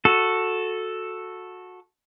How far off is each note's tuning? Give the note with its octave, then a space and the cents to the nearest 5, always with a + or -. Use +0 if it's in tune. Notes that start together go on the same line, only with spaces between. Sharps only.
F#4 -15 A4 +0